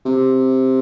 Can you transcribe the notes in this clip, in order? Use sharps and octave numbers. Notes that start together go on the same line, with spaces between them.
C3